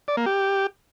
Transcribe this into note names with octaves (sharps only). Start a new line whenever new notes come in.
D5
A#3
G4